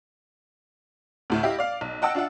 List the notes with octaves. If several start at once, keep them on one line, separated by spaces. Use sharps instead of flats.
D2 A2 E5
E4 G4 D#5 F5
D5 F5
B1
D#5 F#5 G5 A5 E6
D4 F4 E5 F#5